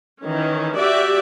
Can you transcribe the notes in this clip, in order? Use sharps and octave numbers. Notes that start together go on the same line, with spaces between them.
D#3 E3 C#4
F#4 G4 D5 E5